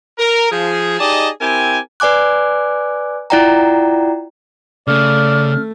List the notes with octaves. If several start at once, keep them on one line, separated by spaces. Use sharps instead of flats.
A#4
F3 G#4
D#4 G4 G#4 D5 D#5 A5
C4 E4 G4 A#4 G#5
B4 D5 G#5 D6 F#6
E4 F4 D5 F#5 G5 A#5
C#3 A3 D5 F6